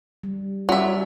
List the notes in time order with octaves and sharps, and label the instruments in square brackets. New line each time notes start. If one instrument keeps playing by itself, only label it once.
[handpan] G3
[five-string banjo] F#3 E5 [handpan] G3 C#4 D5